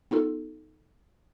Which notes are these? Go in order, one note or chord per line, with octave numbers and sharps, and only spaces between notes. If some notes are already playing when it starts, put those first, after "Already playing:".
B3 D#4 F4 A4